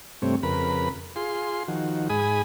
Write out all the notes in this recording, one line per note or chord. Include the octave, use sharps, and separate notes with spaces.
G2 C3 A3 C4 C#5
F2 C#3 A#4 B4 B5
F4 G#4 C6
D#3 F3 F#4
G#2 G#4 G#5 B5 D#6